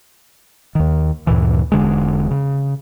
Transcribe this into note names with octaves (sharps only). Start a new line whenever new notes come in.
D#2 D#3
D2 G2 A#2 E3
E1 D3 G#3
C#3